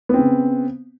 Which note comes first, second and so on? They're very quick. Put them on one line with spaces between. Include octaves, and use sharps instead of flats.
B3 C4 C#3